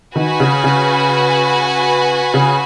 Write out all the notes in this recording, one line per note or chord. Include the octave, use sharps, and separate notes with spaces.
D#3 F#4 B4 G#5
C#3
C#3
C#3